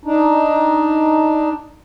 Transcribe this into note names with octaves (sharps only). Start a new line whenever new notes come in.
D4 D#4